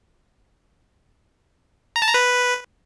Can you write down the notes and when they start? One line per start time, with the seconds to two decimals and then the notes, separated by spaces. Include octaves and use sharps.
1.96 A#5
2.02 A5
2.08 A#5
2.14 B4